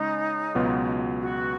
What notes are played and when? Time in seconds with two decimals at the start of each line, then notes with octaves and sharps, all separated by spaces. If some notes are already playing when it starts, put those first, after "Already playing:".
Already playing: C#3 G#3 C#4 D#4
0.55 C#2 B2 F#3 B3 F4
1.21 F#4